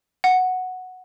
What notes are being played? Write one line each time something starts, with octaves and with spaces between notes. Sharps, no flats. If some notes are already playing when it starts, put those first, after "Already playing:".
F#5